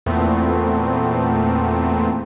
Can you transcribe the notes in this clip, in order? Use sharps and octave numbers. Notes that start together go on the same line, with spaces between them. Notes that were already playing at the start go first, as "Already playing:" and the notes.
E2 A#2 A3 B3 C4